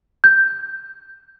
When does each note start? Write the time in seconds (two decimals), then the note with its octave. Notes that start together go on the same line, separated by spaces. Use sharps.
0.24 G6